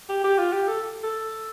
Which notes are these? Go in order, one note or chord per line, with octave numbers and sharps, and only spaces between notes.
G4
G4
F4
G4
A4
A4